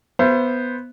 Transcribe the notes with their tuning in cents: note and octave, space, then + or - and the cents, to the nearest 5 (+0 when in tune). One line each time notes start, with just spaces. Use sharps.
B3 +0 C5 +0 E5 +40